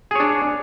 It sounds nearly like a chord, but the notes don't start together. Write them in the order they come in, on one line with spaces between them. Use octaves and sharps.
G#4 C#5 D4